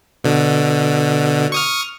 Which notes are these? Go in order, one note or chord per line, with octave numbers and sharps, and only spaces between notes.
B2 D3
C#6 D#6 F6